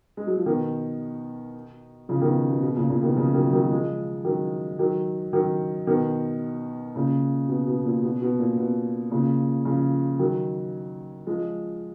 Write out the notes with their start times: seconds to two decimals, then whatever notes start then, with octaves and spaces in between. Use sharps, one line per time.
0.17 G#3
0.27 F#3
0.37 F3
0.46 B2 D#3
2.09 C#3 F3
2.21 B2 D#3
2.50 B2
2.62 B2
2.76 A#2 C#3
2.90 A#2 C#3
3.03 B2 D#3
3.17 C#3 F3
3.34 D#3 F#3
3.53 D#3 F#3
3.71 F3 G#3
4.25 D#3 F#3
4.79 D#3 F#3
5.33 D#3 F#3
5.87 B2 D#3
6.96 A#2 C#3
7.48 B2
7.67 B2
7.85 A#2
8.03 B2
8.22 B2
8.39 A#2
8.57 B2
9.11 A#2 C#3
9.65 C#3 F3
10.19 D#3 F#3
11.27 F3 G#3